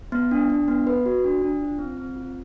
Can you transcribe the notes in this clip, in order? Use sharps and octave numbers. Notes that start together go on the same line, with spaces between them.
B3
D4
D4
B3
B4
F#4
D4
D4
F4
C4
C4
F4